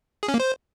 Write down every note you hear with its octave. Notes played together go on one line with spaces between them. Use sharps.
G#4
C#4
A#3
C5